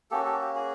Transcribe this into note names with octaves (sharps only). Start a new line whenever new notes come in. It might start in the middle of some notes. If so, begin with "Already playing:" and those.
A#3 C#4 F#4 G4 A4
G4 A4
G4
F#4 G#4